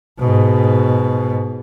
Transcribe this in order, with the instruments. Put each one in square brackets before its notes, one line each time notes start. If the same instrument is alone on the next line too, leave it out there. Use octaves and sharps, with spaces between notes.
[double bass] G#2 B2